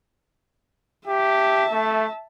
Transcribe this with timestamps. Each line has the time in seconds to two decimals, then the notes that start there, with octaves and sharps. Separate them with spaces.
1.08 G4 E5 A5
1.72 A3